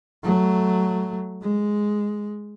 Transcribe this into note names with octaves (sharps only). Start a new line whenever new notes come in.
F#3 A3
G#3